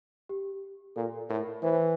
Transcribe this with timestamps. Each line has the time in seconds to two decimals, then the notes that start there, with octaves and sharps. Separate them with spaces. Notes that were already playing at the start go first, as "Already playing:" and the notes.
0.29 G4
0.96 A#2 A4
1.29 A2 A#4
1.63 E3 C5